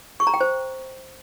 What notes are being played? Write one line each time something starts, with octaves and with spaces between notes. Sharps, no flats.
C#6
A#5
G5
C5